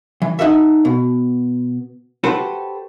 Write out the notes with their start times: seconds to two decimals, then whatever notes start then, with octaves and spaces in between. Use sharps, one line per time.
0.22 E3
0.39 D#4 F#4 A4 E5
0.85 B2
2.24 F#4 G4 A4 B4 C5